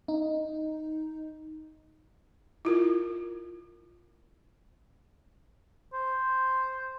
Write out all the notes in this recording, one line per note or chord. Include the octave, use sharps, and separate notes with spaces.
D#4
E4 F4 A#4
C5